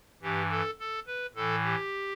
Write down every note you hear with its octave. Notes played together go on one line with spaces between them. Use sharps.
G2 E3 G4
A4
A4
B4
A2 E3 A4
G4